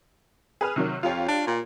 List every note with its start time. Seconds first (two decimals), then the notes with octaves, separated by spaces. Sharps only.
0.61 G#4 B4 F6
0.76 C3 D#3 F#3
1.03 F2 F4 G4 C#5
1.28 D4
1.47 A#2